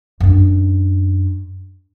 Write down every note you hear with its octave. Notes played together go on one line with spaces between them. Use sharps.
F#2 D4